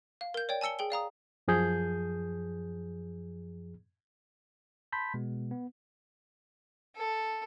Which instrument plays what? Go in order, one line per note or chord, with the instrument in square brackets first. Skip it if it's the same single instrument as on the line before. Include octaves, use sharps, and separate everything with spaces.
[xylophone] F5
A#4 G6
C#5 D5 G5
G#5 A5 E6 C#7 G7
G#4 G5 G7
D5 F5 A#5 D#6
[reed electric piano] F#2 F3 G#4 G6
[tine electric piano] A5 B5 C6 G6 B6
B2 G#3 B3
B3
[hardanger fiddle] A4